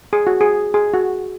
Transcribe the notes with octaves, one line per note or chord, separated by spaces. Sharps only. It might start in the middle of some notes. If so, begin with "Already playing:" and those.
G#4
F#4
G#4
G#4
F#4